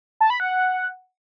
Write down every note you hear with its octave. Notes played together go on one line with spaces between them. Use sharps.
A5
B5
F#5